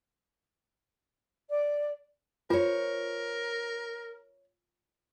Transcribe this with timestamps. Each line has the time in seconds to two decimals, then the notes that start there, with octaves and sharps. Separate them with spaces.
1.49 D5
2.50 F4 A#4 C5 C#5